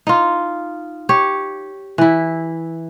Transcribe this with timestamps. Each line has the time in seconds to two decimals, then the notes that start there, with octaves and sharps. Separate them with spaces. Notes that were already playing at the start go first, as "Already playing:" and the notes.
0.07 D#4 F4
1.09 G4 C#5
1.98 E3 E4